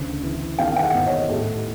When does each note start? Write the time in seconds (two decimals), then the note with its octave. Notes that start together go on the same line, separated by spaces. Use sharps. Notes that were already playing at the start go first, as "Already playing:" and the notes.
Already playing: D2 C#3 E3
0.23 E3
0.59 D#3 F5 G5
0.76 G5
0.83 E5 F#5
0.95 G#2
1.06 C#5 D#5
1.29 A2 G4 A4